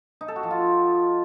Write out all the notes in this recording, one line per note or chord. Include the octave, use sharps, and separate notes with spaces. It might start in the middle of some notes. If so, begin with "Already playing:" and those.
D#4
A4
F#4
F3
F4